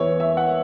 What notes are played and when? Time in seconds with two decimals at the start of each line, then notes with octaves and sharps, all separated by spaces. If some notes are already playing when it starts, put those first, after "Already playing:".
Already playing: E2 E3 B3 E4 C#5
0.20 E5
0.37 F#5